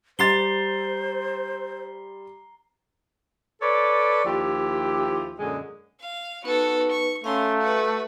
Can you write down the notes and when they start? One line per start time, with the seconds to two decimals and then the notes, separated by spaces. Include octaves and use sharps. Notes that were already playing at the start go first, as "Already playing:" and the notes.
0.19 G3 C5 A#5 C6 A6 C7 G7
3.61 A4 B4 C#5 D5
4.25 D#2 F3 E4 G4
5.39 F#2 A#2 D3 G#3 D#5
6.00 F5
6.44 B3 D#4 F#4 A4 B4
6.91 C#6
7.24 A3 C#4 F5 A#5 C6 E6
7.61 F#4 B4